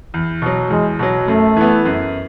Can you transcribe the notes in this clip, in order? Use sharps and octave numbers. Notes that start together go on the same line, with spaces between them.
E2
B2 F#3
E2 G#3
B2 F#3
F#2 A3
E3 B3
F#2